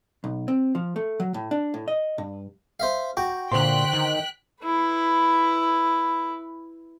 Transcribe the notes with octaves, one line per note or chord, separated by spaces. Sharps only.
B1
C4
F3
A3
F#3
A2
D4
A2
D#5
G2
C5 E5 F5
F#4 G5 A#5 D6
A#2 D3 C5 G5 C6 F#6 B6
D#3
E4 B4